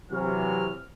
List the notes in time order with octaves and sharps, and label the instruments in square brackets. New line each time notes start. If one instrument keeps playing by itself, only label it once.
[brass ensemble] C3 E3 F#3 [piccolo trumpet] F6